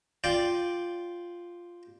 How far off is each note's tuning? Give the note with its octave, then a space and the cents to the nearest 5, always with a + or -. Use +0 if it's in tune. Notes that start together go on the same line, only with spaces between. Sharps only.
F4 +0 D5 +0 G5 +0